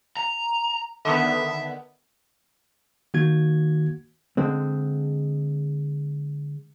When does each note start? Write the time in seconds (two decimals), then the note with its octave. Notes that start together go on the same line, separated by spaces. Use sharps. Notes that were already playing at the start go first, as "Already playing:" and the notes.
0.17 A#5
1.05 D3 D#3 B3 E5
3.14 D#3 A#3 F#4 G#6
4.37 D3 G#3 C4